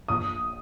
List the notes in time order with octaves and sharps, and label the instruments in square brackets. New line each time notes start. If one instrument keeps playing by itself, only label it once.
[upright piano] A#1 D#6